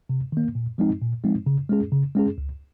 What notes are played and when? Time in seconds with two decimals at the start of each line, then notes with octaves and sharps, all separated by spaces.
0.09 C3
0.32 D#3 A#3
0.55 A#2
0.78 F3 G#3 C4 D#4
1.02 A#2
1.24 F3 G#3 C4 D#4
1.46 C#3
1.69 G#3 C#4 G#4
1.92 C#3
2.15 G#3 C#4 G#4
2.38 C#2